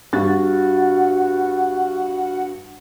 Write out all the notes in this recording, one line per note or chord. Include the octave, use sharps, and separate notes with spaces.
G2 F#4 A6